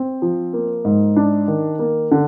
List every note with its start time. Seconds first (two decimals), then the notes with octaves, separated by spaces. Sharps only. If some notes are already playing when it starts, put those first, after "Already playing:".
Already playing: C4
0.22 F3
0.53 A#3
0.85 G#2
1.16 D4
1.48 D#3
1.79 A#3
2.11 D3